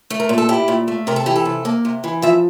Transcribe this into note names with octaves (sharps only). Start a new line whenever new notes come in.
A3
A#4
A#2
A4
E4 G4
A#2
A3
C3 A#4
A4
E3 G4
A4
C3
A#3
C3
E3
F3 E5